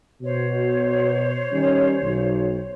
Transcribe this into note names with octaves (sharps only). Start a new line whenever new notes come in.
B2 C5 C#5
D#3 G3 C#4
B1